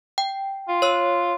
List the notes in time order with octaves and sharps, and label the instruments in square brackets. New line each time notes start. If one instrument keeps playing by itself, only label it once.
[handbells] G5
[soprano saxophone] F4
[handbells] C#5 E6